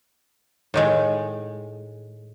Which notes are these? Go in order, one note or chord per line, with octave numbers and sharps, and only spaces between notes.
A2 D#3 G#3